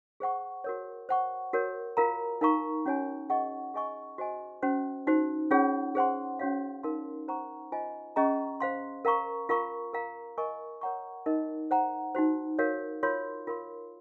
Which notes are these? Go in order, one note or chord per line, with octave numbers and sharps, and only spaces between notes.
G#4 C5 F#5 C#6
F#4 A#4 C#5
C5 F#5 C#6
F#4 A#4 C#5
F4 A#4 F5 A#5
D#4 A#4 F5 A#5 C#6
C#4 F#4 C#5 G#5
G#4 D#5 F#5 C#6
G#4 D#5 G#5 C#6
F#4 C5 D#5 G#5
C#4 F#4 C5
D#4 F#4 C5
C#4 F4 G#4 C#5 F#5
G#4 C5 F#5 C6
C#4 F#4 C#5 F5
D#4 A#4 F5 C6
C5 F#5 A#5 C#6
F4 C5 D#5 G#5
C#4 G#4 D#5 A#5 C#6
C5 F5 C6
A#4 F5 A#5 C#6
F4 A#4 F5 A#5 C#6
A#4 F5 A#5
A#4 D#5 G#5 C#6
A#4 C#5 F#5 A#5 C#6
D#4 A#4 D#5
C5 F#5 A#5
D#4 F#4 C5
F#4 A#4 C#5 F5
F4 A#4 C#5 F5 C6
F4 A#4 F5 C6